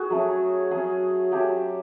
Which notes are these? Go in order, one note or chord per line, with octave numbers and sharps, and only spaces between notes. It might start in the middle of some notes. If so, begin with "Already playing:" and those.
Already playing: F#4 G#4
F#3 A3 C#4
F#3 A3 C#4 G#4
F#3 A3 C#4 G4